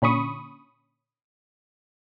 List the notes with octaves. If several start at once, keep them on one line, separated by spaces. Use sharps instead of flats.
A#2 D3 C#4 B5 C#6 D#6